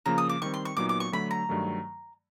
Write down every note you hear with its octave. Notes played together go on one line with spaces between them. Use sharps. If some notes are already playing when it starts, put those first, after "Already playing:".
C#3 F3 A#3 A#5
D#6
D6
D#3 G3 C4 C#6
C6
C#6
A#2 F#3 B3 D#4 D6
D6
C#6
D3 F#3 A3 B5
A#5
G2 D#3 F#3 A3